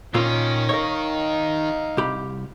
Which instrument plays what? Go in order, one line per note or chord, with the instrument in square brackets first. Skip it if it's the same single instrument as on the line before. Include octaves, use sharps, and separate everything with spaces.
[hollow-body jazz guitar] A#2 A#3 F4 [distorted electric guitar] D#3 [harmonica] C#4
[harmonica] D#4 F5 [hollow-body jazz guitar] A#4 C#5
[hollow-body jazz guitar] C2 G4 B5